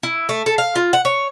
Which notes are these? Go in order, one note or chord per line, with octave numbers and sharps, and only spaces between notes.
E4
A3
A4
F5
F4
F#5
C#5